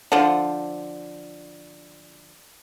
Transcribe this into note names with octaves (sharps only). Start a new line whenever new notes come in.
D3 F3